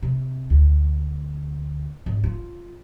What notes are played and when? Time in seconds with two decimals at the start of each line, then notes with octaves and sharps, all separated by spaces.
0.02 C3
0.50 D2
2.06 G#1
2.24 F4